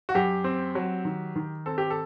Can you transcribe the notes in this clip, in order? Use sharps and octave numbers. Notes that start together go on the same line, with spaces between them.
F#4
F#2 G4
C4
F#3
D#3
D#3
C4 A4
G4
A4